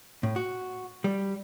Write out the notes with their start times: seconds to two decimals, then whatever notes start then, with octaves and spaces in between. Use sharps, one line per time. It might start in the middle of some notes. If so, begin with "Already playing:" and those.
0.23 A2
0.36 F#4
1.04 G3